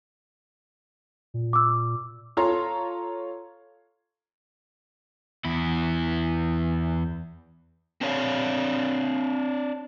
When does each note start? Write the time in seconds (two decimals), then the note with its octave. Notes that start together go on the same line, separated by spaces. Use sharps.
1.34 A#2
1.53 D6 E6
2.37 F4 A4 C#5 F5 A#5 C6
5.45 E2 E4
8.01 C4 D4 C#5 F5